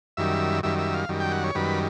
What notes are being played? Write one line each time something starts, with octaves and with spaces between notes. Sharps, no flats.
F#2 D#3 G3 E5
F#2 D#3 G3 E5
E5
F5
F#2 D#3 G3
G5
F#5
C#5
F#2 D#3 G3 B4